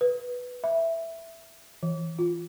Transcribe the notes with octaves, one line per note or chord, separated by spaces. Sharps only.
B4
E5
E3
F4